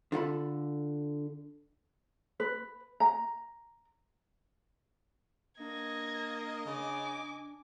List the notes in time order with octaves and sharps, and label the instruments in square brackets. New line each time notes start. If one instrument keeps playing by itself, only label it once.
[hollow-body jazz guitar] D3 F4 A4 B5
[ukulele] B4
A#5
[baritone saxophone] A#3 [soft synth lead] D4 [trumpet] D#5 [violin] G#6 A#6
[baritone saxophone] C#3 [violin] G#5 D6